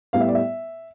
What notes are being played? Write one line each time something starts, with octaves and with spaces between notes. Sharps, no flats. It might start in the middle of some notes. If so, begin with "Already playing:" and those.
A2 G3 B3 F5
E5
D5
E5